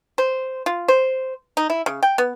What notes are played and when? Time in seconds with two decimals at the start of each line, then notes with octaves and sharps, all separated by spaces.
0.18 C5
0.66 F4
0.88 C5
1.57 D#4
1.70 E4
1.86 C#3
2.03 G5
2.18 B3